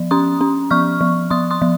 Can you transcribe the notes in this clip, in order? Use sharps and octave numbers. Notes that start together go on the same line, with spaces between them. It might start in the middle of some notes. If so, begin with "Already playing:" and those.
Already playing: F3
C#4 C6 D#6
C#4
F3 C#6 F6
F3
F3 C6 D#6
C6 D#6
F3